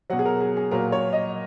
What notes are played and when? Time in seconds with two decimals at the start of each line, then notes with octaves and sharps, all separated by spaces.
0.10 B2 F#3 F#5
0.19 G#4
0.25 A#4
0.41 G#4
0.57 G#4
0.71 A#2 F#3 A#4
0.92 C#5
1.13 D#5